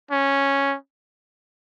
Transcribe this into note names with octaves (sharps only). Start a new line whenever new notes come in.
C#4